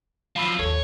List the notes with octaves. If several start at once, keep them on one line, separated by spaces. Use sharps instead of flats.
F#2 F3 F5 B5 E6
G#1 D#2 A4 C#5